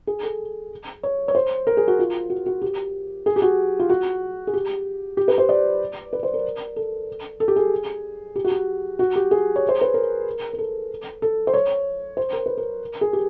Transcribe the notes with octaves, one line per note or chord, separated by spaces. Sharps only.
G#4
A4
C#5
C#5
C5
A#4
G#4
F#4
F4
F#4
F#4
G4
G#4
G4
F#4
F4
F#4
G#4
G4
G4
B4
C5
D5
B4
C5
A#4
A4
A4
G4
G#4
G4
F#4
G4
F#4
G4
G#4
C#5
C5
B4
A#4
A#4
A4
A4
C5
C#5
C5
A#4
B4
A#4
G#4
G4